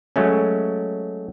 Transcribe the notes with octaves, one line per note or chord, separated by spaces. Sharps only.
F#3 G#3 A3 C#4